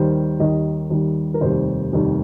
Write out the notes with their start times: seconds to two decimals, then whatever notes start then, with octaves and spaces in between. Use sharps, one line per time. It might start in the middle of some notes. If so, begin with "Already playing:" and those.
Already playing: D#2 D#3 G3 C5
0.39 D#2 D#3 G3 D#5
0.90 D#2 D#3 G3
1.34 A#4
1.41 F1 D#2 D#3 G3 C5
1.93 F1 D#2 D#3 G3